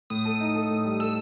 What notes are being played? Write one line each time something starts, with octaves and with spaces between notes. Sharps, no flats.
A2 D#6
A4
D#4
A4
A2
G3
A4 E6